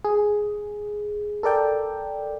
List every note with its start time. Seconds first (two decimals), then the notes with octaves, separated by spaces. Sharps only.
0.05 G#4
1.43 A4 A#4 D5 G5